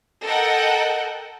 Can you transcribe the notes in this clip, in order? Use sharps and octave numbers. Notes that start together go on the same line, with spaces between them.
A4 A#4 D#5 F#5 G5